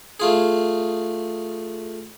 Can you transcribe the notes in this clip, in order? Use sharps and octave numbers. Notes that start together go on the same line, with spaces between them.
A3 F4 G#4